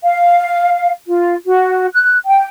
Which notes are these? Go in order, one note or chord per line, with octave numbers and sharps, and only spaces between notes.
F5
F4
F#4
F#6
G5